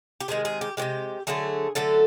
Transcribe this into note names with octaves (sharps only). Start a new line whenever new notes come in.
G4
C3 D#3 G#3 G#4
G#4
G4
C3 D#3 G#3 G4
D3 F#3 A3 G#4
D3 F#3 A3 A4